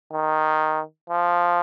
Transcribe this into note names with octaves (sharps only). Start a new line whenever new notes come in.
D#3
F3